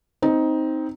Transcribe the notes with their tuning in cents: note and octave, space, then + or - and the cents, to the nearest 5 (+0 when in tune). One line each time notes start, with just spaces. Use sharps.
C4 +0 D#4 +10